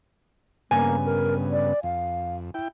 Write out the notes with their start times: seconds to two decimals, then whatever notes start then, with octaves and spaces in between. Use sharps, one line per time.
0.71 G2 C#3 A#3 B3 G#5
1.05 A#4
1.51 D5
1.83 F2 F5
2.54 E4 G5